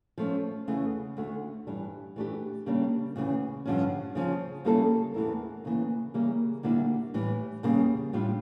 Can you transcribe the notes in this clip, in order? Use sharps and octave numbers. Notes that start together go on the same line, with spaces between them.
F3 A3 C#4
E2 C#3 E3 A3
D2 D3 A3
G2 E3 G3 D4
E3 A3 D4 G4
C#3 G3 A#3 D4
D2 C#3 E3
G2 D3 F3 C#4
C#3 F3 C#4
C#3 G3 A#3 E4 A4
E2 E3 A3 E4 A#4
D2 C#3 E3 A#3
C#3 E3 G3 A#3
D2 D3 G3 A#3 E4
A2 E3 G3
E2 C#3 G3 A#3
A2 G3 D4 F4